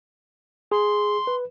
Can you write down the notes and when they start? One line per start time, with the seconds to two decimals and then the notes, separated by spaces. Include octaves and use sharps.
0.72 G#4 C6
1.27 B4